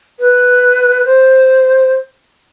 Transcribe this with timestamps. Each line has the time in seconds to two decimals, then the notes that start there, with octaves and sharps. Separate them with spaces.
0.20 B4
1.05 C5